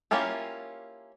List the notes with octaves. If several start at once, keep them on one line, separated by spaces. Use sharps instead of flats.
A#3 C#4 E4 F4 G4